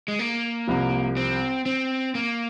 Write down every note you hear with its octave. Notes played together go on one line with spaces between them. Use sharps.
G#3
A#3
C2 C3 F3
C4
C4
A#3